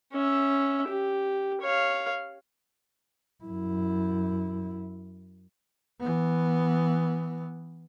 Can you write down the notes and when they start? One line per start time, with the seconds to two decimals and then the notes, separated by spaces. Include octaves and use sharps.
0.13 C#4 E5
0.88 G4
1.62 C#5 F5
3.45 F#2 E4
6.00 E3 B3